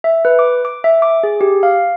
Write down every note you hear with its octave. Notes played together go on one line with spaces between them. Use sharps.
E5
B4
D6
D6
E5
D6
G#4
G4
F5